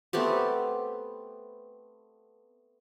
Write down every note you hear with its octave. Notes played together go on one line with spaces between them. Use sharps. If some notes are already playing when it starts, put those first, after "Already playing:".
A3 B3 C4 G4